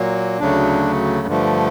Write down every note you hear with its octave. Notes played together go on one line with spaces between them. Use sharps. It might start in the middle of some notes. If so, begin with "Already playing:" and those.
Already playing: A#2 F#3 A#3
D2 C#3 F#3 A3 D4
G2 D3 F3 A3